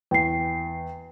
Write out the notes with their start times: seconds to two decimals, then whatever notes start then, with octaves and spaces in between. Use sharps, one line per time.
0.11 E2 G5 C7